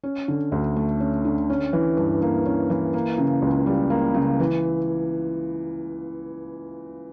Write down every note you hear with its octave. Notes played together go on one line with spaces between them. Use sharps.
C#4
D3
D2
A3
C#4
D3
C#4
E3
G2
A#3
C#4
E3
A#3
C#3
C#2
G3
A#3
C#3
E3